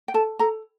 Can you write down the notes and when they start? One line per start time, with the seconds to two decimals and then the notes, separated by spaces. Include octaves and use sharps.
0.08 G5
0.14 A4 A5
0.39 A4 A#5